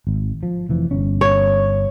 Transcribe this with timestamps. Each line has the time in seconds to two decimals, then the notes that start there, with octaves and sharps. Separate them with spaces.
0.07 G#1
0.43 F3
0.69 F1 E3 F3
0.91 G1 C#4
1.21 C#5